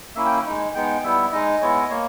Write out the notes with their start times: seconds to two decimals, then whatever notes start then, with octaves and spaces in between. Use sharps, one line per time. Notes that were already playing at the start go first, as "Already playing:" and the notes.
0.15 A#3 C#4 E4 E5
0.26 G5
0.45 G#3 D#4
0.75 G#3 B3 D#4 G5
1.03 G3 B3 E4 E5
1.32 G#3 D#4 D#5
1.61 G#3 B3 E4 C#5
1.76 D#5
1.90 A#3 C#5